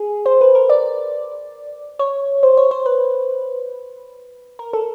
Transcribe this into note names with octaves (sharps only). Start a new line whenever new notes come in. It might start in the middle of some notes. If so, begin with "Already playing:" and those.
Already playing: G#4
C5
B4
A#4
D5
C#5
C5
C#5
C5
B4
A#4
A4